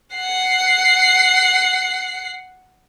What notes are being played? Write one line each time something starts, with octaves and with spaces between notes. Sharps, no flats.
F#5 C7